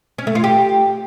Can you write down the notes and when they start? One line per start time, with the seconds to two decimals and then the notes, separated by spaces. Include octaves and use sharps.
0.18 C#4
0.27 A3
0.35 F4
0.44 G4